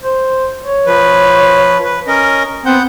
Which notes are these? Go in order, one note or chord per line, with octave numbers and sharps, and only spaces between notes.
C5
C#5
F3 B4
B4
C#4 A#4 D#5
B3 C4 F#5 G6